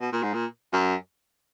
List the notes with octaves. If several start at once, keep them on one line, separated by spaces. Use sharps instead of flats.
B2
A#2
G#2
A#2
F#2